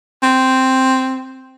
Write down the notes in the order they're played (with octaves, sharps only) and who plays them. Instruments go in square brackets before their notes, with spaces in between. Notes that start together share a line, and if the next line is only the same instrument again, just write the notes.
[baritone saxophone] C4